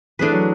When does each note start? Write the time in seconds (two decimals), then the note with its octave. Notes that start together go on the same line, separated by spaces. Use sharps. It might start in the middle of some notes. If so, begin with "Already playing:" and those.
0.19 E3 A3 D4 G#4 B4
0.32 F#3